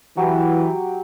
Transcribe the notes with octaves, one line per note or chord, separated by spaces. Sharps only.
E3 F#3 G4